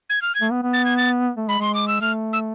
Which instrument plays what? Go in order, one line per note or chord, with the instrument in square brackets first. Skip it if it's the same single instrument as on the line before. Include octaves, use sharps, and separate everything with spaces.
[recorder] G#6
F6
G#6
[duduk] A3
B3
B3
[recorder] A6
G#6
A6
[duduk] A3
[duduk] G#3 [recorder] B5
[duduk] G#3 [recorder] C6
[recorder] D6
E6
[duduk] A3 [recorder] F6
[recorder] E6